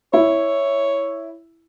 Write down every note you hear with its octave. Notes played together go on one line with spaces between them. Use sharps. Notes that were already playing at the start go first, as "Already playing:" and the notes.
E4 C#5